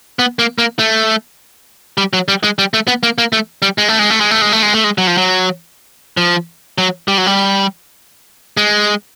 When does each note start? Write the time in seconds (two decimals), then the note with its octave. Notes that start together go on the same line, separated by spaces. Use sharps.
0.19 B3
0.39 A#3
0.58 A#3
0.79 A3
1.98 G3
2.13 F#3
2.28 G3
2.43 G#3
2.59 G3
2.74 A3
2.87 B3
3.03 A#3
3.18 A#3
3.33 A3
3.62 G3
3.78 G#3
3.88 A3
3.99 G#3
4.10 A3
4.20 G#3
4.31 A3
4.42 G#3
4.52 A3
4.63 G#3
4.74 A3
4.84 G#3
4.98 F#3
5.07 F3
5.18 F#3
6.17 F3
6.78 F#3
7.08 G3
7.18 F#3
7.27 G3
8.57 G#3